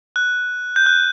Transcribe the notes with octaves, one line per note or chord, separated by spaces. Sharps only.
F#6
G6
F#6